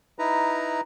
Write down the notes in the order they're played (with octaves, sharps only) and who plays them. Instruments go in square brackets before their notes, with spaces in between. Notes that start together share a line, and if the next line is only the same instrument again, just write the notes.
[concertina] D#4 E4 B4 A#5